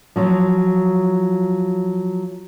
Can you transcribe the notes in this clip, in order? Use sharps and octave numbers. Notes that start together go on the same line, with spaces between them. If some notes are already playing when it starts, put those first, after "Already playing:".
F3 F#3 F4